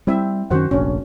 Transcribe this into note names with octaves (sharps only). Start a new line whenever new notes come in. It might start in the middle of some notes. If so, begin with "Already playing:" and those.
G3 C4 E4 E5
F#2 D#3 C#4 F#4 C5 F#5
F1 A#1 C#4 D4